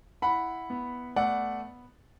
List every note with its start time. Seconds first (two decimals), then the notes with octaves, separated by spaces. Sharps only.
0.22 E4 F#5 B5
0.70 B3
1.16 A3 D5 F#5